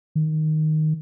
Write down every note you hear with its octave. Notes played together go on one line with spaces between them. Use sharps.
D#3